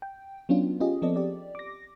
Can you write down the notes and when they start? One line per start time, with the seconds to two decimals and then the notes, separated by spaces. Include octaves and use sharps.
0.02 G5
0.49 F#3 B3 C#4 D4 F4
0.80 C#4 F4 G4 G#4 D#5
1.02 F3 B3 C4 A4 D5 D#5
1.16 G4 D5
1.55 D6 A#6